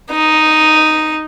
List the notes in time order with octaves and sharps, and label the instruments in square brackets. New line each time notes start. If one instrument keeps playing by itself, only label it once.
[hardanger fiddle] D#4